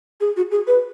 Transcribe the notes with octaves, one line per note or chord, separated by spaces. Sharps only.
G#4
F#4
G#4
B4